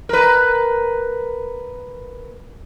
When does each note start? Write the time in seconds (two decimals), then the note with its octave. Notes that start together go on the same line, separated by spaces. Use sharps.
0.09 A#4 B4